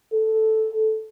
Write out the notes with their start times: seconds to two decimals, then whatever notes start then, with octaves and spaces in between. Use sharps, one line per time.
0.14 A4